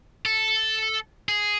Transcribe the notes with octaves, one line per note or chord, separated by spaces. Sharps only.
A4
G#4